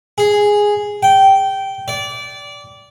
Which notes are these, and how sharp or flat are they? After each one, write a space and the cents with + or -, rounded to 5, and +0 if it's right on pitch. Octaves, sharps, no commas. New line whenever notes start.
G#4 -5
G5 -15
D5 -20